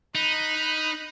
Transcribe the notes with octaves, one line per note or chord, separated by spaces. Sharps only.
D#4 B5 F#6